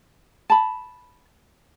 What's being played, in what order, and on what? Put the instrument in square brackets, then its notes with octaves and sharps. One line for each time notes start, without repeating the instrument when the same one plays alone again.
[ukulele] A5 B5